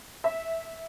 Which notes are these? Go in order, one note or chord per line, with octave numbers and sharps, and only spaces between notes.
E5